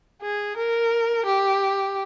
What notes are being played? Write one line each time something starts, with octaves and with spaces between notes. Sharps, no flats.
G#4
A#4
G4